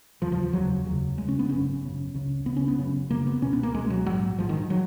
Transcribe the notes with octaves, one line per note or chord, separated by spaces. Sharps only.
F1 D#2 C#3 F3
F3
F3
F1 D#2 C#3 F#3
F1 D#2 C#3
F1 D#2 C#3 G#3
C#4
B3
G#1 F#2 C#3 C#4
G#1 F#2 C#3
C#2 C#3
C#2 C#3 B3
C#4
B3
F#1 F#2 C#3
F#1 F#2 C#3 A#3
B3
C#2 B2 C#4
B3
A#3
C#2 B2 G#3
F#3
A#1 G#2 F#3
A#1 G#2 F3
D#3
F#3